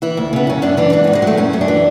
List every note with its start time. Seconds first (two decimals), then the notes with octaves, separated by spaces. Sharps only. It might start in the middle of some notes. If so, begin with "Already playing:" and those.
0.02 E3 E4
0.17 D2
0.33 C#3 B3
0.47 F#2 C#4
0.62 F#2 D4
0.77 E3 D4
0.92 G#2 D4
1.04 G#2 B3
1.15 G#3
1.22 F#3 A3
1.37 F#2 C#4
1.53 F#2
1.61 D4
1.68 E3